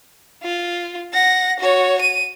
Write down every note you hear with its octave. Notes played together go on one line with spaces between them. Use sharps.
F4
F#5 A#6
F#4 C#5
D#7